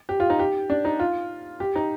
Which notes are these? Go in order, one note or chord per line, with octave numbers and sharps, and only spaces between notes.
G4
F4
D#4
G4
D4
D#4
F4
G4
D#4